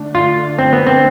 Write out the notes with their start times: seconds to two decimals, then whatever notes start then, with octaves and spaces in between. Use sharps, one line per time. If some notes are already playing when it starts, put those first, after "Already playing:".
Already playing: D3 A3 D4
0.15 F4
0.59 C4
0.73 B3
0.87 C4